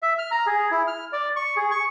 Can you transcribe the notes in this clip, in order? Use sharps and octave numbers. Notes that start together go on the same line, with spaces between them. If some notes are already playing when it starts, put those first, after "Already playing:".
E5
F6
A#5
G#4
E4
F6
D5
C#6
G#4
C#6